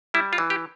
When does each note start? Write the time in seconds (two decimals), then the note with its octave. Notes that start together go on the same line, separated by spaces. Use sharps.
0.14 G3 E4
0.33 F4
0.38 E3
0.50 G4